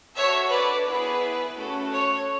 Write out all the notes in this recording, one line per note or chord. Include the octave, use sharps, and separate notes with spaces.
D4 F#4 A4 C#5 E5
B4 D5
B3 E4 G#4 B4
A3 C#4 F#4 A4
C#5